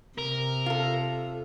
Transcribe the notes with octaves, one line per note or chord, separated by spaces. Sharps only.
C3 A#4
F4 A4